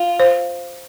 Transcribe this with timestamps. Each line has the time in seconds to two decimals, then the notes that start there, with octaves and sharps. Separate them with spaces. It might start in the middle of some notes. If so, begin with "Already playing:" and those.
Already playing: F4
0.20 C5